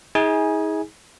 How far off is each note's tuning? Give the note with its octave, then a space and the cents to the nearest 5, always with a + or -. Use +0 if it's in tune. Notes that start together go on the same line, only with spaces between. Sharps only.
D#4 +45 G#4 -5 G#5 +0